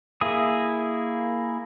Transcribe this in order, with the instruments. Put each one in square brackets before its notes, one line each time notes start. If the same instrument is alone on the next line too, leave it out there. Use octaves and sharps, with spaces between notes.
[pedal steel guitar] A#3 E4 G#4 D#6